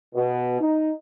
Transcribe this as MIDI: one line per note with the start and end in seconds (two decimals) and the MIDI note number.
0.15 0.58 47
0.60 0.91 63